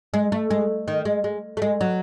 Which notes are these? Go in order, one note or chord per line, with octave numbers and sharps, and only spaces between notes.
G#3
A3
G#3
D#3
G#3
G#3
A3
G#3
F#3